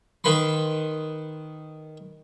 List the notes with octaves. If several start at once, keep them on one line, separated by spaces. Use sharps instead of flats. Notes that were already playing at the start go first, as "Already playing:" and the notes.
D#3 B4 B5 C6